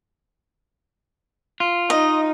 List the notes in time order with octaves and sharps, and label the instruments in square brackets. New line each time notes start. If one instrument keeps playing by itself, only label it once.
[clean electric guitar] F4
[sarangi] D#4 [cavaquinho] D#5